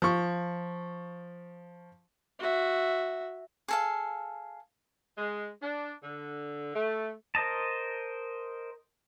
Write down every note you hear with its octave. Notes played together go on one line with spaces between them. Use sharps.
F3 C#6
F#4 E5
G#4 A4 F5
G#3
D4
D3
A3
A#4 C5 D#5 A5